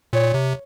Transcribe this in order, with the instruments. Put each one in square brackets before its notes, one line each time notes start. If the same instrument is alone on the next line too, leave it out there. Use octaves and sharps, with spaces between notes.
[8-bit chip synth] A#2 [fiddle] C#5
[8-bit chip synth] C3